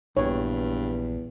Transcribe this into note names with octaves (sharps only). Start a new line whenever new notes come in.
A#1 E2 G2 C#5